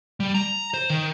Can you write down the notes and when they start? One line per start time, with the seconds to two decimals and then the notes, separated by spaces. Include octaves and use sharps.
0.20 G3
0.35 A#5
0.74 C5
0.90 D#3